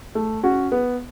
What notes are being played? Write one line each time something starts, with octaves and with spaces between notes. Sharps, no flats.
A3
C#4 F#4
B3